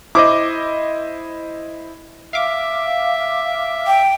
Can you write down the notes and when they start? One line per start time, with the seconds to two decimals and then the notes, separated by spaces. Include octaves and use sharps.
0.15 E4 C5 D#5 D6
2.33 E5 F5 D6
3.87 G5